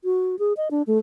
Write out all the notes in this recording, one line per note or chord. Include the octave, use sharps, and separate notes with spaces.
F#4
G#4
D#5
D4
A3